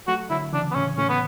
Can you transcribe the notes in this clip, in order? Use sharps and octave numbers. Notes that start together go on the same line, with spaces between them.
F#3 A3 F#4
D3 F#3 E4
C#3 E3 D4
B3
A2 C#3 C#4
A2 C#4
B3